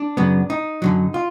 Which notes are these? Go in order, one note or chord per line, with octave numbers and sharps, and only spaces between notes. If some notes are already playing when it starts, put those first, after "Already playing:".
Already playing: D4
F#2 C#3 F#3 B3
D#4
F#2 D3 F#3
F4